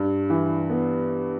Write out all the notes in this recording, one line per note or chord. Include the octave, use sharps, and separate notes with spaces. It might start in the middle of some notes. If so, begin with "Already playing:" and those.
Already playing: G2
E3
B3